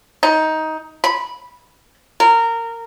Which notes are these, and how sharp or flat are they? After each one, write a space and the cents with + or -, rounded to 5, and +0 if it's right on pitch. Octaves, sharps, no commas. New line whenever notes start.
D#4 +15
B5 -15
A#4 -20